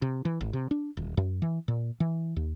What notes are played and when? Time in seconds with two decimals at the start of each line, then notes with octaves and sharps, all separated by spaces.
0.02 C3
0.25 E3
0.41 G#1
0.53 C3
0.71 D4
0.97 D#1
1.17 F#2
1.42 E3
1.68 A#2
2.00 E3
2.36 D#2